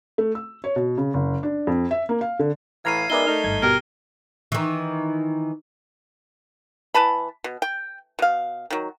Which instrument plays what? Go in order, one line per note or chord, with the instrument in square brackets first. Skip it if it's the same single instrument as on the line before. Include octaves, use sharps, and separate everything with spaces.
[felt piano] A3
E6
C#5
B2
C#3
F#1
D4
F2
E5
A#3
F5
D3
[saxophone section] A2 E3 [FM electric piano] F5 A#5 F6 [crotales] G#6 C7 D#7
[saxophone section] G#3 B3 E5 [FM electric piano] D#4 A#4 D5 [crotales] G7
[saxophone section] A3 D#4 [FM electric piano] F6
[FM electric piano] G#1 G2 G#6
[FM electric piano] B2 G4 [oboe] A#4 [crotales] G7
[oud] D#3 E3
[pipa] E3 B4 A5 B5
B2
G5
B2 F5
D#3 F#3